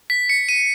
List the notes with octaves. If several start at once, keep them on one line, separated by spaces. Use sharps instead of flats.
B6
C#7
D#7